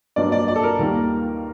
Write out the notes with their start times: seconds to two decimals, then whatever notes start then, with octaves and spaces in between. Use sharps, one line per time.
0.16 G2 F#3 A#3 D4 D5
0.32 D5
0.48 D5
0.56 A4
0.64 A#4
0.79 D#2 D#3 G3 A#3